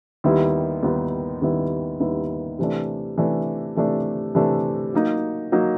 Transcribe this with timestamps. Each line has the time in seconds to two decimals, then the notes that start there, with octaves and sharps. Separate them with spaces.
0.24 D#2 D#3 G3 B3 E4
0.83 D#2 D#3 G3 B3 E4
1.42 D#2 D#3 G3 B3 E4
2.00 D#2 D#3 G3 B3 E4
2.59 C3 E3 A3 D4
3.17 C3 E3 A3 D4
3.76 C3 E3 A3 D4
4.35 C3 E3 A3 D4
4.94 F#3 A#3 D#4
5.52 F#3 A#3 D#4